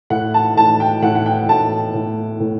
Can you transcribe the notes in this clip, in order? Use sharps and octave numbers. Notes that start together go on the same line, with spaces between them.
A2 F#5
A5
A2 A5
G5
A2 F#5
F#5
G5
A2 A5
A2
A2